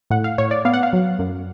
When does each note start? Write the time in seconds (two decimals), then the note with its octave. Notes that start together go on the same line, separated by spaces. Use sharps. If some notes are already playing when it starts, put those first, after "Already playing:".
0.10 A2 F#5
0.24 F5
0.38 A2 C#5
0.51 D5
0.65 B3 F5
0.74 F#5
0.83 F5
0.93 F#3
1.19 F#2